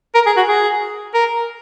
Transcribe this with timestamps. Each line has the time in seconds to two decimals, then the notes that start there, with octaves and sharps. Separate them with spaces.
0.14 A#4
0.26 G#4
0.37 F#4
0.48 G#4
1.14 A#4